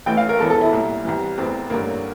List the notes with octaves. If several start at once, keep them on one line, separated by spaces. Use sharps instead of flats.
A1 A2 E3 G5
F5
A#4
E1 E2 E3 A4
A4
E4
C2 A#2
C2 C3 E3
F1 E2 E3 C4
A1 G2 D3 A#3